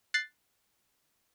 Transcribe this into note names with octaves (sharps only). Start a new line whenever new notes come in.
F#6 A6 C7